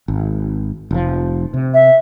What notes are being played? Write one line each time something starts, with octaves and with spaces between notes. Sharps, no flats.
G#1
F1 F3
C3
E5